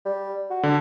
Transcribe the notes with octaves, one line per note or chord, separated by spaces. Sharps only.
G3
F#4
D3